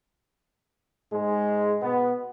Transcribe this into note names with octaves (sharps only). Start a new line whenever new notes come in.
G#2 G#3
B2 B3